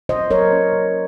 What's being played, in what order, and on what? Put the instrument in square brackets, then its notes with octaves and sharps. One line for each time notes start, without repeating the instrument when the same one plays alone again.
[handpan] F4 C5 D#5
F#3 A#4 C#5
C#4
C#4